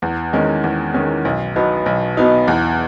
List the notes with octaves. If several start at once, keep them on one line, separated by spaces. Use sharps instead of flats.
E2
D#3 G#3 C#4
E2
D#3 G#3 C#4
B1
B2 F#3 B3 D#4
B1
B2 F#3 B3 D#4
E2